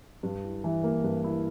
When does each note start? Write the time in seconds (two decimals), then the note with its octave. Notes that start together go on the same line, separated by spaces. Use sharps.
0.23 G2
0.44 E4
0.64 E3
0.84 A#3
1.04 G2
1.24 E4